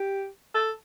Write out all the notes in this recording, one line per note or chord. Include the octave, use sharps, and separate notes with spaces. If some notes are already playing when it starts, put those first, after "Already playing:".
Already playing: G4
A4